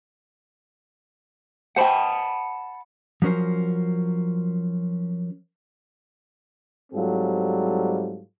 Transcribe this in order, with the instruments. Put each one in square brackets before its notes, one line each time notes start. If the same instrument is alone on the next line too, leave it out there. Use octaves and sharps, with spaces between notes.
[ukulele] C5 G5 [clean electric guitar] F#5 A5 B5
[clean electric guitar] F3 F#3 C#4 A#4 C5
[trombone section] G#2 F#3 G3 C4 F4 A4